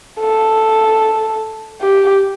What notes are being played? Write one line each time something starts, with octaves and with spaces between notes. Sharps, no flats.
A4
G4